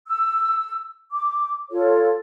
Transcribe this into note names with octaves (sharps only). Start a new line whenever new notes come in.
E6
D6
F4 A4 C#5